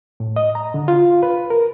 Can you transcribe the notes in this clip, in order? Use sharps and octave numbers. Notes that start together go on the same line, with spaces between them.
A2
D#5
A#5
D3
F4
B4
A#4